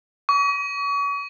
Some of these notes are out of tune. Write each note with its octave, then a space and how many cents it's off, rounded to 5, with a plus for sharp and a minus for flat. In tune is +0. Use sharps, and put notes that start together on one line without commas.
C#6 +40